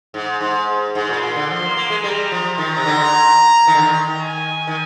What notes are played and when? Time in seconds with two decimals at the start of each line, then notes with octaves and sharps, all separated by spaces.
0.14 G#2
0.41 G#2
0.95 G#2 C6
1.09 A#2
1.22 A#2
1.36 D3
1.49 F3 C6
1.64 A#3
1.77 A#3
1.90 G#3
2.04 G3 A#5
2.32 F3
2.58 D#3 A#5
2.77 C3
2.86 D3
3.67 D#3
3.75 D3
3.81 D#3
4.22 G#5
4.67 D#3